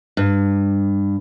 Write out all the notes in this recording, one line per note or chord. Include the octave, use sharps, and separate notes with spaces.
G2